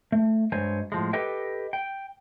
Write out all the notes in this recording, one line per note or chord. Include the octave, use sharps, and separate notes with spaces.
A3
G2 F#3 G#3 C5 C#5 G#5
A2 F3 G#3
G4 A4 B4 D#5 G5
G5